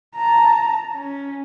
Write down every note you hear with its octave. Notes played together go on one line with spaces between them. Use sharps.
A5 A#5
C#4